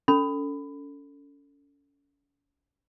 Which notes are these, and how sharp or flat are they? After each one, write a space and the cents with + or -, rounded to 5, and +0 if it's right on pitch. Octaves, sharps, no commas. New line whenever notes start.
C#4 +35 A4 +20 B5 +20